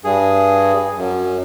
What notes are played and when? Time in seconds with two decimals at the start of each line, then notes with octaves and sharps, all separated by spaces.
0.04 G2 G#4
0.97 F#2